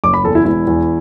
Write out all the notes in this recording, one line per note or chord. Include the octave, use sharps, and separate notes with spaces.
F#1 D6
B5
E2 A4
E4
E1 E4
E2